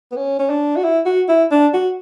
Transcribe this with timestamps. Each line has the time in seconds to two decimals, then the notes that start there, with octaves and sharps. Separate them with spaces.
0.12 B3
0.16 C#4
0.39 C#4
0.50 D4
0.76 F#4
0.84 E4
1.06 F#4
1.29 E4
1.51 D4
1.74 F#4